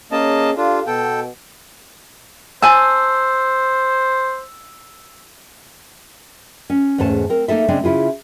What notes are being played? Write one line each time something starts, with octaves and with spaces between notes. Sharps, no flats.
A#3 C#4 G#4 D#5 A5
D4 F4 G4 A4 F5
B2 A4 G5
C5 G#5 A5 E6
C#4
E2 G#2 A3 C#4 A5
C4 A#4
A#3 D#4 A4 E5
C#3 G#3 C4 D4
C#3 E4 F4 G#4